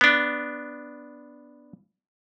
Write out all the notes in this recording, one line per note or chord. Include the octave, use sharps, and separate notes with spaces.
B3 D4